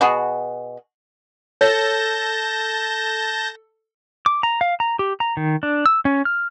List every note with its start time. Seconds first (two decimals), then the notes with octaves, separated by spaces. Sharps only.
0.01 B2 F#4 G#4
1.61 A4 C#5 A5 G6 A#6
4.26 D6
4.43 A#5
4.61 F5
4.80 A#5
4.99 G4
5.20 A#5
5.37 D#3
5.63 D4
5.86 E6
6.05 C#4
6.25 F6